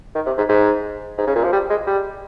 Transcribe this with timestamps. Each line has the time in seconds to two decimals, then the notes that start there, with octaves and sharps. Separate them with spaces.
0.15 D#3
0.26 C3
0.38 G#2
0.49 G#2
1.18 G#2
1.27 C#3
1.35 A#2
1.44 F3
1.52 G3
1.70 G#3
1.87 G3